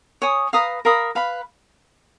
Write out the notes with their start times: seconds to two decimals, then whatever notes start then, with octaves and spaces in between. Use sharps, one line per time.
0.22 C#5 G#5 D#6
0.53 B4 F5 A#5 D#6
0.85 A#4 F5 B5 D#6
1.15 B4 F5 B5